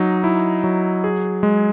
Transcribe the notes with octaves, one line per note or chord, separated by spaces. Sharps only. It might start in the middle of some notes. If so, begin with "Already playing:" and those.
Already playing: F#3 D#4
E4
F#3
G#4
G#3